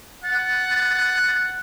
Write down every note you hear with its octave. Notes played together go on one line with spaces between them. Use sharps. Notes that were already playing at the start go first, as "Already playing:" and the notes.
F#5 A6